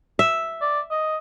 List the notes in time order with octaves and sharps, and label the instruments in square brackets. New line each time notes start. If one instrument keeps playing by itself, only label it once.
[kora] E5
[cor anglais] D5
D#5